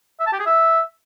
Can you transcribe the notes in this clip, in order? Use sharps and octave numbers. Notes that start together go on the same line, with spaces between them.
E5
A5
G4
G#4
E5